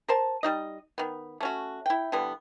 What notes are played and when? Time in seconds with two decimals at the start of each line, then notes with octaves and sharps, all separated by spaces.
0.08 A#4 C5 A5
0.43 G3 D#4 D#5
0.98 D#3 B3
1.40 A3 C#4 F#4
1.86 E4 G5
2.12 D3 E3 G3 B3